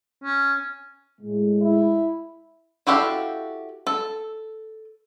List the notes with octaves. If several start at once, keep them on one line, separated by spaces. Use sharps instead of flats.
C#4
A2 G#3
E4
E4 F#4 G4 A4 F5
A4